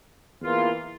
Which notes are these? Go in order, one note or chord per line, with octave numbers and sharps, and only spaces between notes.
E2 E3 A#3 F4